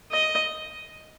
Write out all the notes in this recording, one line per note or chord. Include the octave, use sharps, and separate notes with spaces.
D#5